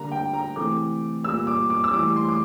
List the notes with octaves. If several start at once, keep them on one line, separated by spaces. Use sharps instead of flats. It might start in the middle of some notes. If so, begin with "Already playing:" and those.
Already playing: D3 G3 A#3 A#5
G5
A#5
C3 E3 A3 D6
A#2 G3 A#3 E6
D6
D6
E6
A2 E3 G3 D6
C6
D6